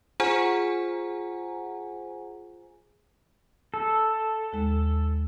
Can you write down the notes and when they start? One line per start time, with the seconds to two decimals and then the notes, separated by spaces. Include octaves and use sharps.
0.20 F4 G#4 C5 F#5 G#5 A#5
3.74 A4
4.52 D#2 G#3